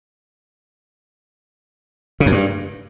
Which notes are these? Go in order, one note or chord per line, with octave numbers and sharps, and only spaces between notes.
C#3
F#2
G2